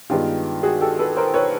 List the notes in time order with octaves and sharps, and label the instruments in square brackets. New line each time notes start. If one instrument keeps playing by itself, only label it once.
[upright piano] G2 D#3 G#3 B3 F4 G4
F#4 G#4
G4 A4
A4 B4
A#4 C5
B4 C#5